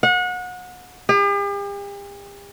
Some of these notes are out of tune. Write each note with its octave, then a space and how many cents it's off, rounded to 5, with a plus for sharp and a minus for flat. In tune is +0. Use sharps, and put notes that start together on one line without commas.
F#5 -30
G4 +45